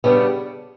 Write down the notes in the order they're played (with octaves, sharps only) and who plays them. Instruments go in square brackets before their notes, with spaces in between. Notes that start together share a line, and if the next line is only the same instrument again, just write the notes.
[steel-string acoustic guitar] C#3 G3 B3 D4